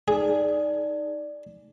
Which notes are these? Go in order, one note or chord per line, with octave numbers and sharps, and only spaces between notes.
D#4 G#4 D5